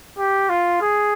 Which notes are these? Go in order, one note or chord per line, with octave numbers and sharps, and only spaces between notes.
G4
F4
G#4